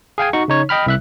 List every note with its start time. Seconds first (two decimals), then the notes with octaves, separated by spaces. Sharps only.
0.18 G#4 F5 G5 G#5
0.33 D#4 F#4 C#6
0.48 C#3 D#4 C#5
0.69 D#5 G5 B5 F6
0.86 C2 E5 F#6